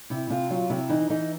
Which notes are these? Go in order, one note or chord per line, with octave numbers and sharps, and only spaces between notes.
C3 E4
C3 F4
F#3 F4
C3 E4
E3 D#4
E3 D#4